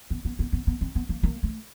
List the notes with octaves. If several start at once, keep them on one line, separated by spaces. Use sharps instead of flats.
B3
B3
B3
B3
B3
C4
B3
A#3
A#3
A3